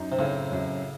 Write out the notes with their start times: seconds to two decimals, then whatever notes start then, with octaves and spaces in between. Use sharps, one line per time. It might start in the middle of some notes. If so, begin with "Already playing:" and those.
Already playing: F#2 D#4
0.12 C3
0.19 A2 C#3 C4
0.52 F#2